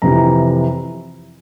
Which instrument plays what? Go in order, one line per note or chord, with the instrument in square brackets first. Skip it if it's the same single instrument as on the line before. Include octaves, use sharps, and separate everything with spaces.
[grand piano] F2 C3 E3 A#5